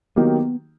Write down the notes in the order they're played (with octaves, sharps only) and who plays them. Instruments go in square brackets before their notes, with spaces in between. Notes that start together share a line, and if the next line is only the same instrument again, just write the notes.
[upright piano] D#3 F#3 A#3 D#4 G4 [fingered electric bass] B3